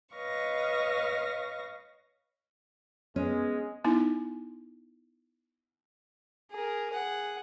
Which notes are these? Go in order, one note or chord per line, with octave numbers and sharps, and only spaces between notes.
B4 C#5 D#5 F5 C#6 A#6
G#3 B3 C#4
B3 D#4 E4
G#4 A#4
G#4 F#5